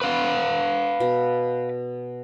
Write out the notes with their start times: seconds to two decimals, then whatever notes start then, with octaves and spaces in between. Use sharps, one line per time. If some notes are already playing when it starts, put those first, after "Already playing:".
0.02 B4 F5 F#5
1.00 B2